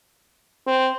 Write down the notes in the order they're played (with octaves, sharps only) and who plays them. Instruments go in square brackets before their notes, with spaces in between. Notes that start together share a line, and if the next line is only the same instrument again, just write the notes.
[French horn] C4